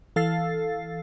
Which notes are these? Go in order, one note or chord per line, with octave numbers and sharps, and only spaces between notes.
E3 A4 F5 E6 A6 C7